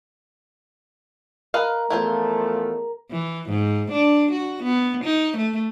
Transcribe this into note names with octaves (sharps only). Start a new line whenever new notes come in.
A#4 B4 D#5 F5
E2 F3 A3 E4 F4 C5
E3
G#2
D4
F#4
B3
D#4
A3